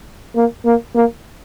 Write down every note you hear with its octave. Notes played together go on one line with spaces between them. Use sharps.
A#3
A#3
A#3